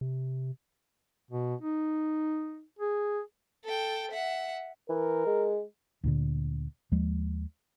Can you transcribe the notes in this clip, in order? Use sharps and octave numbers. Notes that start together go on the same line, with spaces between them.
C3
B2
D#4
G#4
A4 G5
E5 F#5
E3 A#4
G#3
D2 A#2 D3
D#2 F3 G#3